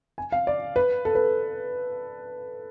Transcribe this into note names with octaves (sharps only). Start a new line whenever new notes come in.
G#5
F5
D5
B4
A4
B4